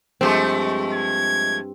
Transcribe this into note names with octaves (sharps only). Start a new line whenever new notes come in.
G2 F3 G#3 A3 C4
G#6